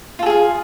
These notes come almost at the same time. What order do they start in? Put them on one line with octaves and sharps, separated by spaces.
F4 A4 G#4 F5